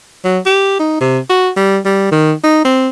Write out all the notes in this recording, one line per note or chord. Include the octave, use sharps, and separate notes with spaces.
F#3
G4
D#4
C3
F#4
G3
G3
D#3
D#4
C4